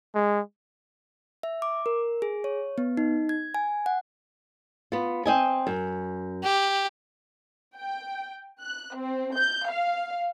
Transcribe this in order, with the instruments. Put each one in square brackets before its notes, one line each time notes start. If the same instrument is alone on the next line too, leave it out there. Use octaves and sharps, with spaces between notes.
[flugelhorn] G#3
[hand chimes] E5
D6
A#4
G#4
C#5
B3
D#4
G#6
G#5
F#5
[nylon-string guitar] B3 F4
C4 D#5 G#5
F#2
[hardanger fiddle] G4
[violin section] G5
F#6
C4
G6
F5